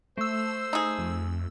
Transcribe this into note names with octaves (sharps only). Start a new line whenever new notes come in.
A3 C5 E6
D#4 G#4
F2